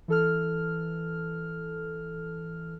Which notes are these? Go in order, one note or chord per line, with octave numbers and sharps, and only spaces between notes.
E3 A4 F6